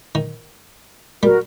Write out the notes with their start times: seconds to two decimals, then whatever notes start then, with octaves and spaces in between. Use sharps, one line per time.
0.15 D#3
1.23 G3 F#4 A#4